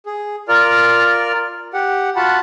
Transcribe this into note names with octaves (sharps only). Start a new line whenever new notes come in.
G#4
F4 A#4 D5 F6
G4 F#5
F4 F#4 F#5 A5 B5